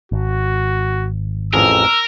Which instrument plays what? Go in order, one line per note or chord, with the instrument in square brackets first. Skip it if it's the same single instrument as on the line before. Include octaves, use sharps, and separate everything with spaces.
[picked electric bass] G#1 [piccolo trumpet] F#4
[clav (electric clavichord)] A1 F2 G#4 [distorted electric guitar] A#4 [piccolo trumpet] E6